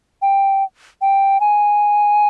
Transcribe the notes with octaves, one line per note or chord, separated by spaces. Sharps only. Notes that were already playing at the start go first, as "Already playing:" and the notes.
G5
G5
G#5